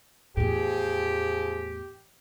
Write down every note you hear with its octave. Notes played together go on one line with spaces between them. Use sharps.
E2 A2 F3 G4 G#4